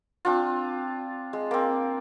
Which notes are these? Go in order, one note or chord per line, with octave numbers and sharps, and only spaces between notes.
C4 D4 F4
G#3
A#3 C4